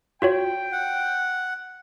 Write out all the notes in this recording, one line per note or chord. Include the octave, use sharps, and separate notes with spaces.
F4 F#4 C#5 G5
F#5